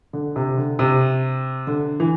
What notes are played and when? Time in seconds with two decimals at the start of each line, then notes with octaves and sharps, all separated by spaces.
0.13 D3
0.36 C3
0.58 D3
0.79 C3
1.67 D3
2.00 E3